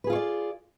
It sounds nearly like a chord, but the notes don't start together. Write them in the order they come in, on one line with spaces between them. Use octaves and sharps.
B4 G#4 F4 C#5 D5